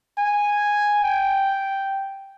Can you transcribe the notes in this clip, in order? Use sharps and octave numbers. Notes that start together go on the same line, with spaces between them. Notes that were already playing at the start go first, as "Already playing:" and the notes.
G#5
G5